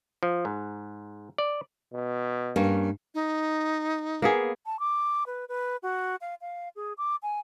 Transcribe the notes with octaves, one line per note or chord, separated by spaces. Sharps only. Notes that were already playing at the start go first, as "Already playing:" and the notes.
F3
G#2
D5
B2
G2 A#3 C#4
D#4
A#3 B3 G#4
A5
D6
B4
B4
F#4
F5
F5
G#4
D6
G#5